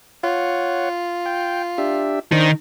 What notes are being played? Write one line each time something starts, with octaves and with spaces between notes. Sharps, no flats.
F4 C#5 F#5
G5
D4 G4 E5
D#3 D4 C5